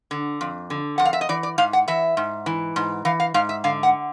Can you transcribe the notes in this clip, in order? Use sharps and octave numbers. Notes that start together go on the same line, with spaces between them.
D3
F2
D3
F2 F#5
F5
E5
D#5
E3 D5
D5
G#2 F5
F#5
E3 E5
G#2
E3
G#2
E3 F5
F5
G#2 F5
E5
D3 F5
F#5